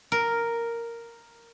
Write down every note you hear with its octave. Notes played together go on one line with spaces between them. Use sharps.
A#4